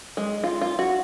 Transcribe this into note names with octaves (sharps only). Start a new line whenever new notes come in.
G#3
F4
F4
F#4